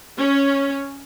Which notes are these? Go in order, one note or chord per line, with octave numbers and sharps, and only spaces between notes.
C#4